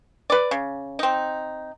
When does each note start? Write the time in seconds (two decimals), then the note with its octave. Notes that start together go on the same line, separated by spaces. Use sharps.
0.30 B4 D5
0.51 C#3
0.99 C4 D#4